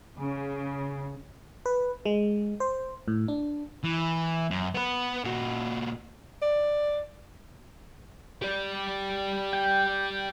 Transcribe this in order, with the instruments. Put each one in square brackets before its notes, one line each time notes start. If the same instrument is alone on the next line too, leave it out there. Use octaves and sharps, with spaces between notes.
[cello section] C#3
[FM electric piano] B4
G#3
C5
A2
D4
[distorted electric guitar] E3
F#2
B3 B4
A#2 F#4
[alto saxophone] D5
[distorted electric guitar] G4 D5
[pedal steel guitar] G5